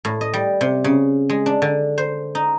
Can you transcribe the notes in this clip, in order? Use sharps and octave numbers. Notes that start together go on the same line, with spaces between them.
A2
D#5
G3
C3
C#3
G#3
D4
D3
C5
D#4